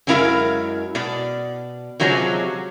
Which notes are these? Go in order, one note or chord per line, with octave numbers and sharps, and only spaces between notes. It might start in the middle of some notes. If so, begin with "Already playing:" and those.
F#2 F#3 G#3 E4 A#4 F5
B2 D5
C3 F3 F#3 G#3 A3 C#4